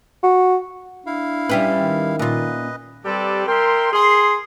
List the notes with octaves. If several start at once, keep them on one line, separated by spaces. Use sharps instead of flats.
F#4
D4 E4 F5
G3 C#4 G4 B4 E5
D#3
A#2 F4 B4 D#5
G3 C4 G4 A4 B4 D5
A#4 E5 G5 C6
G#4 C6